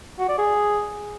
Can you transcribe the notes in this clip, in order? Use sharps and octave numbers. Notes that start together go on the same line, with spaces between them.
F#4
D5
G#4